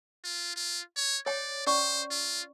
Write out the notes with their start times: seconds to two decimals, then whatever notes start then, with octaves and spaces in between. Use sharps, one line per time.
0.24 F4
0.56 F4
0.97 C#5
1.26 C#5 D5 G5
1.67 C#4 C5 D5 C#6
2.11 F4